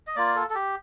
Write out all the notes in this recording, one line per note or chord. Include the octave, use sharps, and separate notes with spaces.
D#5
A#3 F4 D5
A4
A4
G4